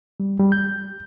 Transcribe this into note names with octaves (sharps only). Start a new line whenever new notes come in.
G3
G3
G6